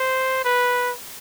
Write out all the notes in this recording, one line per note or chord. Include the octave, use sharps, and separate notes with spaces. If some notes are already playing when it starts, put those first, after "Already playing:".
Already playing: C5
B4